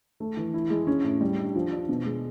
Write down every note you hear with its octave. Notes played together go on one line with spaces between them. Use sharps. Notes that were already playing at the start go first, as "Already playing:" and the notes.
A3
E3
E4
G#3
C#4
A2
G3
D4
F3
D4
B2
G#3